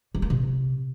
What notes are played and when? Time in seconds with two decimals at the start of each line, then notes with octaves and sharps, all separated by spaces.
0.15 G3
0.22 A#3
0.30 C3